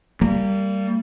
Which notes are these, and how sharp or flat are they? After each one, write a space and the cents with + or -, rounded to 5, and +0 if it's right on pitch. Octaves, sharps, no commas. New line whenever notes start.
G3 +0 A#3 -30